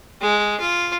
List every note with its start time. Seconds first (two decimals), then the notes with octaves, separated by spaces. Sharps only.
0.21 G#3
0.60 F4